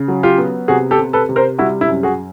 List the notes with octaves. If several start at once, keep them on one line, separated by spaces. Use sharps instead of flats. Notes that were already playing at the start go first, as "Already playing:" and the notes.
Already playing: C#3
F#3
F4 G4
B3
C3 F#4 G#4
G4 A4
C3
A4 B4
C3
A#4 C5
G3 E4 F#4
E4
F#2
F#4 G#4